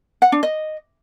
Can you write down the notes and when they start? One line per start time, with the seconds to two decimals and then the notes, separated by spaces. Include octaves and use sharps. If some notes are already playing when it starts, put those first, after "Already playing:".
0.22 F#5
0.32 D4
0.43 D#5